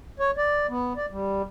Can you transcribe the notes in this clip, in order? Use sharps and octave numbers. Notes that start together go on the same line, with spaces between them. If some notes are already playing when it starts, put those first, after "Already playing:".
C#5
D5
B3
D5
G3